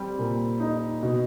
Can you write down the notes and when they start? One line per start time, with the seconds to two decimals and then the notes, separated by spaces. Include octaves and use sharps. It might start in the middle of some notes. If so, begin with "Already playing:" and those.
Already playing: G3 C4
0.19 A#2
0.60 D#4
1.03 B2